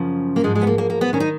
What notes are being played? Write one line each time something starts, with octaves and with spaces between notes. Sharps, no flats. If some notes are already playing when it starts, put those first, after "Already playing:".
Already playing: F#2 C#3 F3
A#3
G#2 F3 G#3
G#3
B3
A#3
A#3
A#3
B3
D#3 C#4
D#4